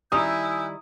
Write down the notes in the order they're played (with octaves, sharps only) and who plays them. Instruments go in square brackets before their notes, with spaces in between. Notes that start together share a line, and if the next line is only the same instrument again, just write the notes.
[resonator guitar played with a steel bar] D#3 G3 A#5 [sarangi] E4 [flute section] G#5 E6 G6 [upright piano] D#6